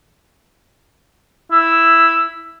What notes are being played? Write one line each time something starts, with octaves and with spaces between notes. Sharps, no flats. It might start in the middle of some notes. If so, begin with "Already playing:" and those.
E4